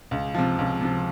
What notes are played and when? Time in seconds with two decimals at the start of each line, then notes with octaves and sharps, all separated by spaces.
0.11 C#2
0.34 C3 F3
0.59 C#2
0.81 C3 F3